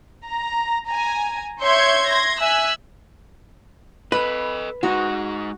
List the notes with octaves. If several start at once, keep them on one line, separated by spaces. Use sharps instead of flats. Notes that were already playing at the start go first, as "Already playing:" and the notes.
A#5
G#5 A#5
C#5 E5 C6 G6 G#6 C#7
C6 G#6 A#6
E5 G#5 E6 F#6
A4 B4 D#5 B5
G#3 D#4 F#4